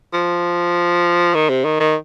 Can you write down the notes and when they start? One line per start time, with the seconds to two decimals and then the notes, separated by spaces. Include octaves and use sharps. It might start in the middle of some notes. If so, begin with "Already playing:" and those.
0.13 F3
1.34 D#3
1.49 C3
1.65 D#3
1.80 D#3